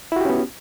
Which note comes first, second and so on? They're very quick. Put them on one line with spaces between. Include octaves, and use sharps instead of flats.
E4 F#4 G4 C#4 B3